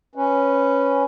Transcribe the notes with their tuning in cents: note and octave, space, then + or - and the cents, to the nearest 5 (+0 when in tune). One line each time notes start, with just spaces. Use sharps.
C#4 +0 B4 +0